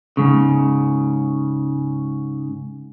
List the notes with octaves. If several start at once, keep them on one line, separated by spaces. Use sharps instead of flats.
G#2 C#3